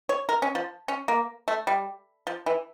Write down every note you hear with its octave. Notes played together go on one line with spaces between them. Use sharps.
C#5
A#4
C#4
F3
C#4
A#3
A3
G3
F3
E3